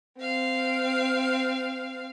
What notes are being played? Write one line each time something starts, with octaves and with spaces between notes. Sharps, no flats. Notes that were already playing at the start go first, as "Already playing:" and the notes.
C4 F5